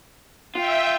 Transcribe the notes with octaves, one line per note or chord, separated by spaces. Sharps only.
F4 E5 G5